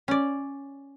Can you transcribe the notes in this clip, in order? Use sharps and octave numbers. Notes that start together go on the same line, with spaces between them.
C#4 D5